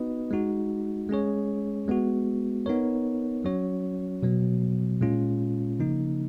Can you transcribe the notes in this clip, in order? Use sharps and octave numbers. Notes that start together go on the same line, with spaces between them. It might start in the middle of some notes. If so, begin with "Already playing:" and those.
Already playing: B3 D#4 F#4 B4 D#5
G#3 D#4 F#4
G#3 C#4 G#4 C#5
G#3 B3 F#4
B3 D#4 A#4 C#5
F#3 C#4 F#4 C#5
B2 F#3 B3
A#2 G#3 C#4 F4
C#3 F3 A#3 D#4